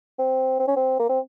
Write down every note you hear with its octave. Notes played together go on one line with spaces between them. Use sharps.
C4
C4
C#4
C4
A#3
C4